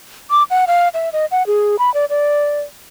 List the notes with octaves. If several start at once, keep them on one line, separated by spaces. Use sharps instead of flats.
D6
F#5
F5
E5
D#5
F#5
G#4
B5
D5
D5